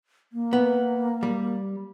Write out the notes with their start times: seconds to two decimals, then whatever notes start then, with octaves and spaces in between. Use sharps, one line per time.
0.33 A#3
0.53 B3
1.23 G3